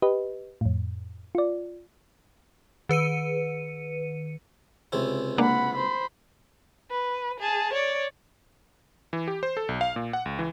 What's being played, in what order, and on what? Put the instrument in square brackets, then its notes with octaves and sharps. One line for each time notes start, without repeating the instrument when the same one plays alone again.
[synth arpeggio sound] G4 B4 D#5
F2 A2
F4 D5
[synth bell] D#3 B4 C#7 D#7
[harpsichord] C#2 C3 E4
[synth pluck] G#3 A#3 D4 [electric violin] F#5 B5
[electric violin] C5 B5
[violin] B4
G#4 A5
C#5 D5
[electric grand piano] E3
G4
C5
A4
B1
F5
A#2
F#5
C#2
E3